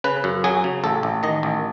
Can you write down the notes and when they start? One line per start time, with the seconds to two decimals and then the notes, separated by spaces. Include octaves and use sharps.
0.04 C#3 B4
0.24 F#2
0.44 F#3 G#4
0.64 C#3
0.84 A1 A4
1.03 A1
1.23 D#3 D#5
1.43 A1